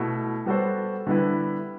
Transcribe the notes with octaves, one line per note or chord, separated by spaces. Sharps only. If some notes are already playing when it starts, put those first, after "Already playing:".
Already playing: B2 A3 E4
G3 B3 F#4 A4 C5
D3 G3 B3 E4 B4